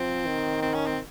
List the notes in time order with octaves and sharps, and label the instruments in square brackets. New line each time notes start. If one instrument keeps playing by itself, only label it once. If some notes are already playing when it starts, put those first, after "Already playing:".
Already playing: [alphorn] F3 [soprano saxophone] C4
[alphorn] D#3
[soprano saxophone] C4
C#4
C4